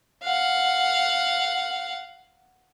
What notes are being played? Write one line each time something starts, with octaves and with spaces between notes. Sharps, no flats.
F5 F#5